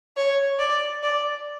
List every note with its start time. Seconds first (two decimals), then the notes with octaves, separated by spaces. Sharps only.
0.17 C#5
0.59 D5
1.03 D5